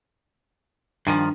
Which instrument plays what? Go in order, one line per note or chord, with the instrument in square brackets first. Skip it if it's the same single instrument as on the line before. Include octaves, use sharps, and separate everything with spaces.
[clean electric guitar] G2 D#3 F3 [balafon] D4 G#5